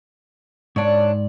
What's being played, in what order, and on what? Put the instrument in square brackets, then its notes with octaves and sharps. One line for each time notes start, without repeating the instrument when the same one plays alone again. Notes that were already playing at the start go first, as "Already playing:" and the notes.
[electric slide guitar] G#2 D5 [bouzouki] D4 C#5